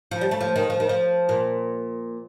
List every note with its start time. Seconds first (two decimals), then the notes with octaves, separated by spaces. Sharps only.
0.11 F3
0.21 G3
0.31 A3
0.41 F3
0.56 D#3
0.70 F3
0.80 D#3
0.89 F3
1.29 A#2